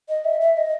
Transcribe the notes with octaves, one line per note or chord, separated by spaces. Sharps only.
D#5
E5
E5
D#5